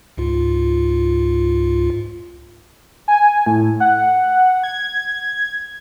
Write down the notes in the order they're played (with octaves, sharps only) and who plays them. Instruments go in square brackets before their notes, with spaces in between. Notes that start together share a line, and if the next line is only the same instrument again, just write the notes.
[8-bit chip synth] C#2 G#2 F4
[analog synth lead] G#5
A2
F#5
G#6